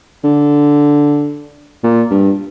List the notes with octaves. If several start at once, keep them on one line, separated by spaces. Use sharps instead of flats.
D3
A#2
G2